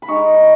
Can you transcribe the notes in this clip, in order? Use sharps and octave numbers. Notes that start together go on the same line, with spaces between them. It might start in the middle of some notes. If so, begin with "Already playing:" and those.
B5
G#3 D#4 C#6
B5